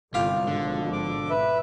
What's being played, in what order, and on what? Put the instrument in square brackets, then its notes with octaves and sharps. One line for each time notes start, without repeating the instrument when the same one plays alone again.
[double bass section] G1 [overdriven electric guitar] C2 [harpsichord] F4 G4 F5
[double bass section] G#1 B2 F3 [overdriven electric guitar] D3
[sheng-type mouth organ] D6
B4 E5